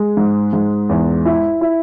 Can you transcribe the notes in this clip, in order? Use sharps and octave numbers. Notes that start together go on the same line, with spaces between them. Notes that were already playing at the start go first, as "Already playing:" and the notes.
Already playing: G#3
G#2
G#2
E2
E4
E4